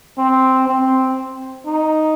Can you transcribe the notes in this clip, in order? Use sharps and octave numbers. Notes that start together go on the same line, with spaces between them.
C4
C4
D#4